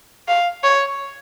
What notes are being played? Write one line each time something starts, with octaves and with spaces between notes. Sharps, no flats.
F5
C#5